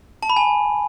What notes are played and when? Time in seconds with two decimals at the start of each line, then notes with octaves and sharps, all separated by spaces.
0.23 A5
0.30 B5
0.37 G#5